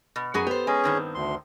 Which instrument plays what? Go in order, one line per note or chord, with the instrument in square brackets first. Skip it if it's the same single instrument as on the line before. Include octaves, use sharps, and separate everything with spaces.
[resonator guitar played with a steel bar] B2
[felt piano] F#2 A#5 [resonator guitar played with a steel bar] B3 F#4 G#4
[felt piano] B3 A4 B4 [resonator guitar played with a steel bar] G4 C5
[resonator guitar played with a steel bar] G#3 [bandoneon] C#4 G#4
[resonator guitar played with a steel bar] G2 D#3 C4
[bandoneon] D2 C6